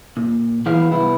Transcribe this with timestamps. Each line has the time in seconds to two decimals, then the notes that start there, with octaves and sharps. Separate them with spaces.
0.17 A#2
0.66 E3 B3 E4 G#4 F5
0.91 C2 B3 E4